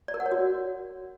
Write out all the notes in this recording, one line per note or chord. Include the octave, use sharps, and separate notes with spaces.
D5
A#4
F#5
C#5
F#4